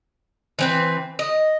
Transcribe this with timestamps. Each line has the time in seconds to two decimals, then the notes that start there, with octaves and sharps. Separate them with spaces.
0.59 E3 C4 B4
1.19 D#5